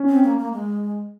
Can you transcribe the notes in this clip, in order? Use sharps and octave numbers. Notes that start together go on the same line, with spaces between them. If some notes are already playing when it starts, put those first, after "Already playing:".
Already playing: C#4
C4
A#3
A#3
G#3